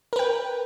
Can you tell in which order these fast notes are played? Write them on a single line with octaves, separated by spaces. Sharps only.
A#4 B4 G5